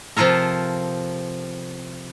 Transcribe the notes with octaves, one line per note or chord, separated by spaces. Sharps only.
C3 F3 F4 A4 A#4